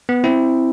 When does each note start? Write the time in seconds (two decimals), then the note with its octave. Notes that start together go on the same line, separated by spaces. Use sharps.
0.09 B3
0.24 C4 E4